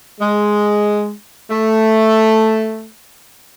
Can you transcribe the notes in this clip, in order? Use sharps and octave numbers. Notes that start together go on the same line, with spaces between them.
G#3
A3